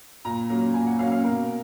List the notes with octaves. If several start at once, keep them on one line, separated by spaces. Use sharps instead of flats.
A#2 A#5
F#3 A#3 C#4
A#2 G#5
F#5
F#3 A#3 C#4 F5
F5
B2 A#4